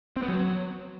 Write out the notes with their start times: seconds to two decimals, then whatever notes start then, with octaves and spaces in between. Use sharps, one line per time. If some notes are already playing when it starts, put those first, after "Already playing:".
0.16 C4
0.22 B3
0.28 F#3